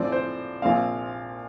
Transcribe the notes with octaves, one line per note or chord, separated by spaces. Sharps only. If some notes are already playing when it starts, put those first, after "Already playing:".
Already playing: A#1 A2 F3 C4 D5
C5
A#1 A#2 F3 C4 F5